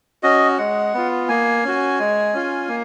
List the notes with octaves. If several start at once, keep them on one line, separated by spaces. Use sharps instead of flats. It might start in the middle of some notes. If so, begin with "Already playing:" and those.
C#4 F#4 D#5
G#3 F#5
B3 F4
A#3 G#5
C#4 F#4
G#3
C#4 F4
A#3